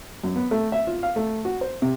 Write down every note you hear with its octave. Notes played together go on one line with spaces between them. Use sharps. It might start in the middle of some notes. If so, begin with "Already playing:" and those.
F#2
B3
A3
E5
F4
F5
A3
F#4
C5
C3